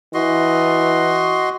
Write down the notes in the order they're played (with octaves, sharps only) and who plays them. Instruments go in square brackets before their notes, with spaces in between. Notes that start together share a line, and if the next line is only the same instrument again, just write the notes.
[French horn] E3 [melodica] F#4 D#5 C6